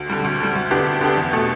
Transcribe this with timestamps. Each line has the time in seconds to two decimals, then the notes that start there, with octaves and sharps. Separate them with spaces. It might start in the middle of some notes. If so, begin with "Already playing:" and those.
Already playing: D2
0.10 D3 G3
0.24 D2
0.40 D3 G3
0.55 D2
0.71 D3 B3 D4 G4
0.86 D2
1.01 D3 B3 D4 G4
1.17 E2
1.33 B2 A3